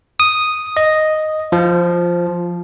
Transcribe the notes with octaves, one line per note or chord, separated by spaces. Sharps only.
D#6
D#5
F3